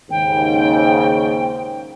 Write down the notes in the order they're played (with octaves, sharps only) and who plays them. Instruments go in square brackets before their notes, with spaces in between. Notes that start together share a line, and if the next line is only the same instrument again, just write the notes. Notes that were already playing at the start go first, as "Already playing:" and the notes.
[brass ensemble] D#2 G#2 C#3 [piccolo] G5